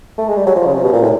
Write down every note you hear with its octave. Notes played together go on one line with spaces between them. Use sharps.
A3
G#3
G3
F#3
F3
C#3
C3
B2
A#2
A2